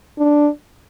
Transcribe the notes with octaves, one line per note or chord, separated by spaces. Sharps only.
D4